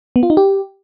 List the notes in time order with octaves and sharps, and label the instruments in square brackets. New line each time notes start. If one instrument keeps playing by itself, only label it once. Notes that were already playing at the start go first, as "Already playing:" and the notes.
[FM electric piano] B3
F4
D#4
G4